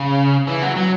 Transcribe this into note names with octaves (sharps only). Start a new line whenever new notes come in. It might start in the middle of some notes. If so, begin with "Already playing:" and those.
Already playing: C#3
E3
F#3
F#3